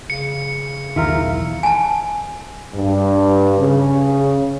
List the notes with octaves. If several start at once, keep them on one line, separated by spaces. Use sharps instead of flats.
C#3 C#7
B1 E2 D#3 E4 F4 A#4
G#5 A5
G2
C#3